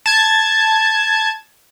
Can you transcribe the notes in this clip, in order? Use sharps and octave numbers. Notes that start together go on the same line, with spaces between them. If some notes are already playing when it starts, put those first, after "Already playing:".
A5 G#6